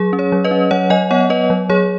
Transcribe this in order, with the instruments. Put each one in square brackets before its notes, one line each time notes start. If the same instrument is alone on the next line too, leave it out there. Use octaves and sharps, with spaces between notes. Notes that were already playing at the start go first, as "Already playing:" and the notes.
Already playing: [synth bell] F#3 G#4
C#4
G#4 C#5
F#3
B4 D#5
C#4
F#3 C#5 F#5
F#3 D#5 G#5
B3 C#5 F#5
B3 B4 D#5
F#3
F#3 G#4 C#5